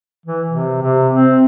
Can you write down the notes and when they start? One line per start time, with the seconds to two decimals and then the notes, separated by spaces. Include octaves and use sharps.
0.26 E3
0.51 C3
0.82 C3
1.14 C4